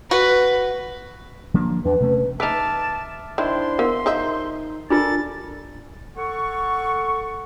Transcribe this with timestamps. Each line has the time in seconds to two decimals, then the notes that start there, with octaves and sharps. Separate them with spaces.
0.11 F#4 B4
1.54 F3 A#3 D4
1.85 E2 D4 B4
2.00 C3 A3 C#4
2.40 D#4 B4 E5 A5 D6 F6
3.38 D#3 D4 E4 C5 C6
3.79 B3 A#4 F5
4.06 F3 D#4 D#5 E5 G6
4.90 D4 F4 A4 A#4 D5 A6
6.17 A4 F#5 C#6